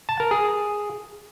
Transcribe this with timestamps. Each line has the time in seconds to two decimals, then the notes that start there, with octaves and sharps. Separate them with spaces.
0.09 A5
0.20 A#4
0.31 G#4